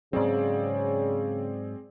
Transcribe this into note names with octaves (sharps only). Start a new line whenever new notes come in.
G#2 C#3 F#3 C4 G#4 D5